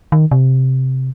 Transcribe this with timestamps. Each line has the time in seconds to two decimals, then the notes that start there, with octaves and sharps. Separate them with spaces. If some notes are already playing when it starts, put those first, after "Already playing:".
0.12 D#3
0.31 C3